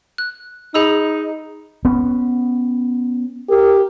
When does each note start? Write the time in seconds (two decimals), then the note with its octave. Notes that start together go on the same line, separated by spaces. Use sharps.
0.18 F#6
0.74 D#4 G#4 B5 E6
1.85 B3 C#4
3.49 G4 A#4